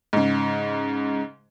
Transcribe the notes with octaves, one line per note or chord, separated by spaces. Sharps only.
G#2 C#3